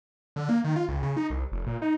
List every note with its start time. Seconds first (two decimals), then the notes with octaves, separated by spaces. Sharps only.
0.36 D3
0.49 A#3
0.64 D#3
0.76 F4
0.88 C#2
1.03 C#3
1.17 D#4
1.30 C2
1.52 F1
1.67 A#2
1.82 D#4